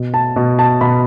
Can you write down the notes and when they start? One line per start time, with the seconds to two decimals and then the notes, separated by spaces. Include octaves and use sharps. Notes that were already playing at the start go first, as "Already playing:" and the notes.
Already playing: B2
0.14 A5
0.36 B2
0.59 A5
0.81 B2 B5